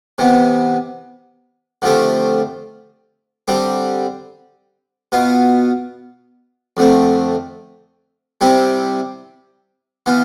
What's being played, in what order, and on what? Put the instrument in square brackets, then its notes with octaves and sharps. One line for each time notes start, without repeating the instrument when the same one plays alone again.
[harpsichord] C3 E3 B3
D3 F3 A3 C4 G4
D3 G3 C4 G4
B2 B3 F4
F2 D3 A3 C4
C3 G3 C4 E4 G4
E3 B3 F4